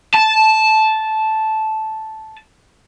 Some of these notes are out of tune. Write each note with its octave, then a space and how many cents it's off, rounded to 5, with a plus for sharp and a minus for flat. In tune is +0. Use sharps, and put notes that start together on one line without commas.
A5 -10